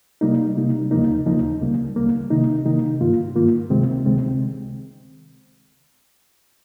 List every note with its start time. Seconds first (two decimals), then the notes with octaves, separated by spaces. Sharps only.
0.21 C3 G3 A#3 D#4
0.57 C3 G3 A#3 D#4
0.91 D#2 C#3 F3 A#3 D#4
1.26 D#2 C#3 F3 A#3 D#4
1.61 C#2 C#3 G3 A#3
1.96 C#2 C#3 G3 A#3
2.30 C3 D#3 A#3 D#4
2.66 C3 D#3 A#3 D#4
3.00 G2 D#3 A#3 F4
3.36 G2 D#3 A#3 F4
3.70 C#2 C3 D#3 G#3 C4
4.05 C#2 C3 D#3 G#3 C4